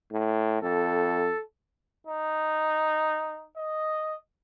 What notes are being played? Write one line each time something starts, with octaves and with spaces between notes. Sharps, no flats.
A2
F2 A4
D#4
D#5